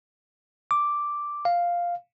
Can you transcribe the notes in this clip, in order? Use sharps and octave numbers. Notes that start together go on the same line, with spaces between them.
D6
F5